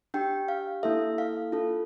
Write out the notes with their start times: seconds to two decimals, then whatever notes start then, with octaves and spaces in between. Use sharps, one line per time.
0.14 D4 G4 G5
0.48 F5
0.83 A#3 E4 A4 E5
1.18 F5
1.52 D4 F4 A4